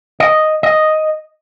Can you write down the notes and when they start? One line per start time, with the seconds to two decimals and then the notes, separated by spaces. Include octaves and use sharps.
0.20 D#5
0.63 D#5